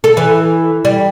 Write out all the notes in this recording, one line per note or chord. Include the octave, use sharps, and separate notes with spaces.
A4
E3
G3